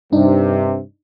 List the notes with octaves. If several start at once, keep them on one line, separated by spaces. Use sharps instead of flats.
G2 C3 D4 D#4